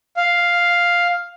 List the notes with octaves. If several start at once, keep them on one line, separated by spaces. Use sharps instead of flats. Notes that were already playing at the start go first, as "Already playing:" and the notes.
F5